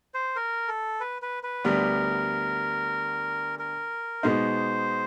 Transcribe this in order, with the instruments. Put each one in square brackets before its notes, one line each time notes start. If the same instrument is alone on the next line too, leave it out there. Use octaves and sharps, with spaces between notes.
[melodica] C5
A#4
A4
B4
B4
B4
[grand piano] D2 D3 G3 B3 D4 [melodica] A#4
[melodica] A#4
[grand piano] B2 G#3 B3 D#4 [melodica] C5